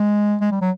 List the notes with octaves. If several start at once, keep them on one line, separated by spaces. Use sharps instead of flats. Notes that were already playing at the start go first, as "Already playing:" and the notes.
Already playing: G#3
G#3
G3
F#3